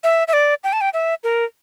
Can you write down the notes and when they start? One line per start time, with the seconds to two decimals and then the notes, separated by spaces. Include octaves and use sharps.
0.04 E5
0.28 E5
0.33 D5
0.64 G5
0.73 A5
0.81 G5
0.94 E5
1.24 A#4